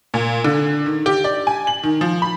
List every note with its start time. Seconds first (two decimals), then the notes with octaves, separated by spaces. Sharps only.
0.14 A#2
0.44 D3
0.86 D#3
1.06 G4
1.24 D5
1.47 G#5
1.67 F#7
1.83 D#3
2.01 F3
2.22 B5